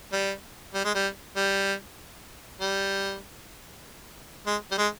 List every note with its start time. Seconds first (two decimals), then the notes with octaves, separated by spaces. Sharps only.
0.12 G3
0.74 G3
0.84 G#3
0.95 G3
1.36 G3
2.61 G3
4.47 G#3
4.71 G3
4.78 G#3